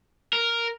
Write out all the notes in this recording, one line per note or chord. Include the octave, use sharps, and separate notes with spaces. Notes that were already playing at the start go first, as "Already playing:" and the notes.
A#4